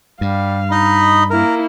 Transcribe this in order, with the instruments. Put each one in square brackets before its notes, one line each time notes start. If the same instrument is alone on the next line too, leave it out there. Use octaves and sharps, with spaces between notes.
[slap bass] G2 [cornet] G3 [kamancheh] F5
[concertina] D#4 D#5 [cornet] B5
[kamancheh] A#3 E4 [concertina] A#4